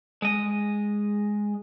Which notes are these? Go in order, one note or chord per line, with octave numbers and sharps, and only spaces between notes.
G#3 D#5